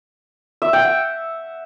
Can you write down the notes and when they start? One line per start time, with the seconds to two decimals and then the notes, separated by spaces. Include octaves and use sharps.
0.62 E5
0.73 G5
0.85 F#5